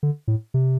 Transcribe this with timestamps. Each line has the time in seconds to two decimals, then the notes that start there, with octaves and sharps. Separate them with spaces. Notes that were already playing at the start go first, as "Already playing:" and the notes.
0.03 D3
0.28 A2
0.54 C3